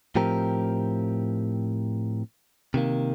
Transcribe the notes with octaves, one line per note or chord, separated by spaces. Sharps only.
A2 F3 C4 G4 A#4
C3 D#3 A#3